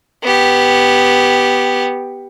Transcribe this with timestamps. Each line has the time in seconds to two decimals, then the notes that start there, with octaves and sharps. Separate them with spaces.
0.23 B3 G4